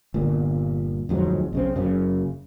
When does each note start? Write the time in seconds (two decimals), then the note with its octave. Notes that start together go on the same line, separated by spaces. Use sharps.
0.14 G1 A#2
1.09 D1 F2 G#2 F#3
1.53 B1 C#3 C4
1.76 F#1 F#2 C#3